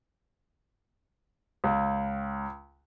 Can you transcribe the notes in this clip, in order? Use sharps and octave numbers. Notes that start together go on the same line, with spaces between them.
C#2